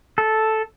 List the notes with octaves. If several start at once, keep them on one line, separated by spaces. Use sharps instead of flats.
A4